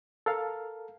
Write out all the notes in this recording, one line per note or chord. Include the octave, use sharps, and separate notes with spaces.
A4 A#4 F5